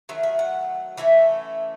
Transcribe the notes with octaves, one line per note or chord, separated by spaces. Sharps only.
D#3 F#3 A3 E5
E5
F#5
E3 A3 C#4 E5